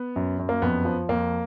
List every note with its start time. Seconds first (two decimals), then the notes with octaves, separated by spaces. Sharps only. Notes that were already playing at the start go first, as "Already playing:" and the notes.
Already playing: B3
0.16 F#2
0.39 F#2
0.49 A#3
0.62 F2 B3
0.85 F3
1.09 F2 A#3